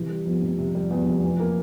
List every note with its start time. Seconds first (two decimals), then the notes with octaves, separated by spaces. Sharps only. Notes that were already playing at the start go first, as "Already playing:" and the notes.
Already playing: C3 E3
0.09 G3
0.26 E2 F3
0.42 F1
0.59 C3
0.75 G3
0.90 E2
1.07 F1
1.24 E3
1.40 A#3